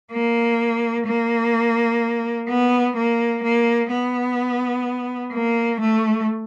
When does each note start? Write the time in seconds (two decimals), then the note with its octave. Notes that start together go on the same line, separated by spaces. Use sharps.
0.12 A#3
1.06 A#3
2.48 B3
2.96 A#3
3.43 A#3
3.91 B3
5.32 A#3
5.80 A3